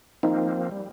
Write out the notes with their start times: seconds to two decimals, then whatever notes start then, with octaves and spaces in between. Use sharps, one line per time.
0.23 F3 A#3 C4 D#4
0.71 G3